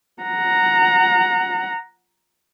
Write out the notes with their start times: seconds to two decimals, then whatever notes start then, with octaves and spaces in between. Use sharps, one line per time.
0.23 F#5 A#5